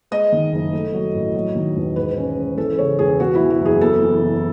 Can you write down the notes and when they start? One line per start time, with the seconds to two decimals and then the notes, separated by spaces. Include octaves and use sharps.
0.11 G#3 D#5
0.32 D#3
0.52 F#1
0.73 A3
0.93 F#3
1.14 A1
1.35 F#3
1.55 D#3
1.76 E1
1.96 G#2 B4
2.17 C#4
2.37 G#2
2.57 E3 A4
2.78 C#3 C#5
2.99 E1 G#4
3.19 B3 F#4
3.35 E4
3.40 E3
3.50 F#4
3.61 F#1 G#4
3.81 B3 A4
4.02 E3
4.22 F#1